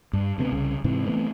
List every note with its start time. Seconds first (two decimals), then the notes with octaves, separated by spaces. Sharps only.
0.13 G2
0.38 D2 C3 A3 B3
0.51 C2 C#3
0.84 G#2 C3 E3
1.06 E3 A3 B3 C4